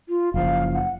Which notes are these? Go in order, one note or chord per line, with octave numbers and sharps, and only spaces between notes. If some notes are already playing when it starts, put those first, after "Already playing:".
F4
F#1 F3 F5
F#5